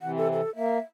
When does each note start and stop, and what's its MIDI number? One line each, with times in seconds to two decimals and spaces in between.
0.01 0.41 48
0.01 0.41 52
0.01 0.11 78
0.17 0.28 69
0.33 0.54 69
0.56 0.78 58
0.56 0.79 76